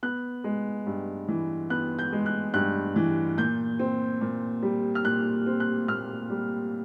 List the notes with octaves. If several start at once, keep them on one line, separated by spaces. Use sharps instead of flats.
B3 F#6
G#3
G2
E3
B3 F#6
G6
G#3
F#6
G2 F#6
E3
A#2 G6
C4
A#2
G3
F6
A#2 F#6
C4
F#6
A#2 F6
G3